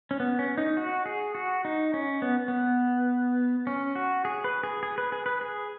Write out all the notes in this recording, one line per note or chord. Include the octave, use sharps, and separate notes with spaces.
C#4
B3
C#4
D#4
F#4
G#4
F#4
D#4
C#4
B3
B3
C#4
F#4
G#4
B4
G#4
G#4
B4
G#4
B4
G#4